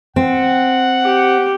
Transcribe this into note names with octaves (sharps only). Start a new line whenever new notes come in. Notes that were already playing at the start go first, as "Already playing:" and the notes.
C4 F#5
G4